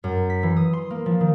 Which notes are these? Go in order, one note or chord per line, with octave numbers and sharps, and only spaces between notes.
F#2
B6
E3
D#6
C6
A#3
F3
D#3